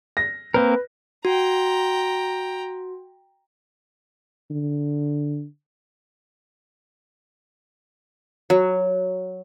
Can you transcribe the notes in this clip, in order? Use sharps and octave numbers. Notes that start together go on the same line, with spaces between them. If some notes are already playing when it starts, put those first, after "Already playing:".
A#6
A#3 C4 A#4 B4
F#4 G5 A#5
D3
F#3